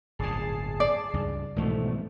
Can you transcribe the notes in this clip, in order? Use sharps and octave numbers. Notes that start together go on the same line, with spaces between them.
D1 G1 A#2 G#4 A5 C7
D5
C#2 G2
C2 G#2 B2 E3 F3 A3